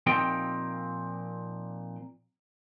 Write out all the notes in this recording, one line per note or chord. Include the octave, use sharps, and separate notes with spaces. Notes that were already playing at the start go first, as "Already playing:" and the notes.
A#2 F3 C4 D#4 G4 G5